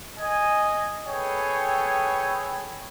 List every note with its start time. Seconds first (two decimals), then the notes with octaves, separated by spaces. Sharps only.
0.18 D#5 G#5
1.06 G#4 A4 B4 C#5 G5 G#5